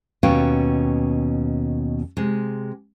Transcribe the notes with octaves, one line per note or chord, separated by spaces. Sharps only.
D#2 B2 C#4 B4 F5 G5
C3 G#3